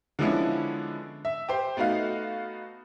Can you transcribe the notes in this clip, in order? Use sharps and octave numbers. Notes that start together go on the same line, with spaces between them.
D3 F3 G#3 B3 C#4 E4
E5
G4 C5
A3 B3 D#4 F#4 F5